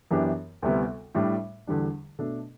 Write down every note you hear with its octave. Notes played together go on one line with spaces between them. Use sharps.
F#2 E3 B3 D4 G4
D2 C3 G3 B3 E4
A2 G3 D4
E2 D3 G3 D4
B2 A3 D4 A4